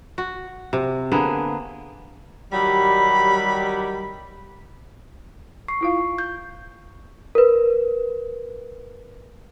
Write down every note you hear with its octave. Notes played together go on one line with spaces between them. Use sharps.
F#4
C3
D3 A#3 B3 G#4
D#3 F#3 G3 B5
C#6 C7
E4 F4 F5
G6
A#4 B4